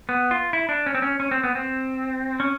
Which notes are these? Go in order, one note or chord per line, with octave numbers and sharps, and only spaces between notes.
B3
F4
E4
D4
C#4
C4
C#4
C#4
C4
B3
C4
C#4